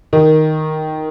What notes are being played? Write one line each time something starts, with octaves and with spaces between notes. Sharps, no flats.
D#3